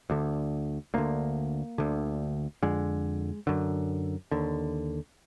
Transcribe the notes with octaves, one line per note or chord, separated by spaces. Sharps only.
D2 D3
D2 D3 A#3
D2 D3
F2 D3 G#3
F#2 D3
D#2 D3